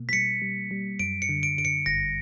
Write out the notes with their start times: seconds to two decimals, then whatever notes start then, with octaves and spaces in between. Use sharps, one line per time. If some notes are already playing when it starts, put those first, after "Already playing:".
Already playing: B2 A#3
0.09 B6
0.13 G3 C#7
0.42 G3
0.71 G3
0.99 F#2 D7
1.22 C#7
1.29 D3
1.43 D7
1.58 D3 D7
1.65 C#7
1.86 G1 A#6